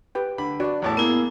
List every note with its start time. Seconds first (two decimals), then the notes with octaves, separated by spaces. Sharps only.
0.15 G4 B4 G5
0.38 D3 B5
0.60 D4 F#4 D5
0.82 E2 A2 A5
0.97 A#3 B3 E4 G#4